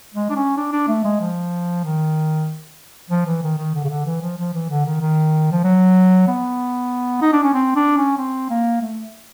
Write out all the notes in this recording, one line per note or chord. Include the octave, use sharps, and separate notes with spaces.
G#3
D4
C#4
D4
D4
A3
G#3
F3
D#3
F3
E3
D#3
D#3
D3
C#3
D3
E3
F3
F3
E3
D3
D#3
D#3
F3
F#3
B3
D#4
D4
C#4
C4
D4
C#4
C4
A#3
A3